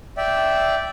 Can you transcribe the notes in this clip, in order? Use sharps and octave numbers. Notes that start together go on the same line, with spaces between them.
D5 E5 G5